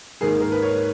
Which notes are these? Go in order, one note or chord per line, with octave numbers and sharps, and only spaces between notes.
G#2 D#3 A#3 G#4
A#4
B4
C#5